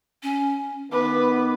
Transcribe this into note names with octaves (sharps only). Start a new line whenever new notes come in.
C#4
D#3 B3 B4 D6